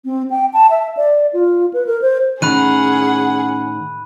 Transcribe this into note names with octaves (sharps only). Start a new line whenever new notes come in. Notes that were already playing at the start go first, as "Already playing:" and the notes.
C4
G5
A5
E5
D5
F4
B4
A#4
C5
A2 D#3 C#4 G#4 F#5 B5 F#6 D#7